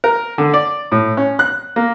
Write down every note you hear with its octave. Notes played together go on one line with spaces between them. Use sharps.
A#4
D3
D5
A2
C#4
F#6
A#3